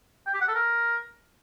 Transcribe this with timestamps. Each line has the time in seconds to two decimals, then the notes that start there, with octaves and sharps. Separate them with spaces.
0.27 G5
0.34 G4
0.41 F#5
0.48 A4
0.55 A#4